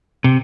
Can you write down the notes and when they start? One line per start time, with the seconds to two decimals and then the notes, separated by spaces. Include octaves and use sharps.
0.24 C3